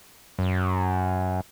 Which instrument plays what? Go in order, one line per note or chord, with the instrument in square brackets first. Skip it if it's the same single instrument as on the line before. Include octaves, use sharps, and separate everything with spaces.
[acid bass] F#2